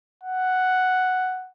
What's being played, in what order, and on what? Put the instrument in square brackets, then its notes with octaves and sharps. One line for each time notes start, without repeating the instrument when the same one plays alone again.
[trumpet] F#5